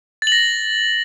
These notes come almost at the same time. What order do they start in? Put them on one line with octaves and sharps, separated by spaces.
A6 F#7 A#6